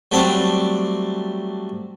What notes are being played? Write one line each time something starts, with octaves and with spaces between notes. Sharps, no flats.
F#3 G3 A3 C4 D4